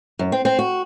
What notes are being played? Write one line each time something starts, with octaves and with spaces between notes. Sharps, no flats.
F#2
C4
C4
F#4